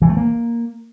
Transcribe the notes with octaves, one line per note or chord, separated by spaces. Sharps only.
E3
A3
A#3